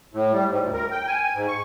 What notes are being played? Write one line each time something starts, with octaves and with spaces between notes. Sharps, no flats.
A2
G3
G#2
D2
A#4
G5
G#5
G#2
C#6